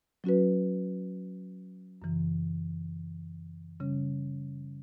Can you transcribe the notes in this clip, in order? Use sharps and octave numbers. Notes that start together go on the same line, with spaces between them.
F#3 C#4 F#4 B4
F#2 C#3 E3
C#3 G3 C#4